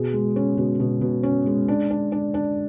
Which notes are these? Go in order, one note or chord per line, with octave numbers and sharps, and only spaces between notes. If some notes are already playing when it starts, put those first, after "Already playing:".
Already playing: B2 G#4
G#3
C#4
B2
B2
B2
C#4
G#3
D4
D4
D4
D4